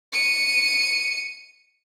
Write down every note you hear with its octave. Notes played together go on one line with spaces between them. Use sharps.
C#7 D#7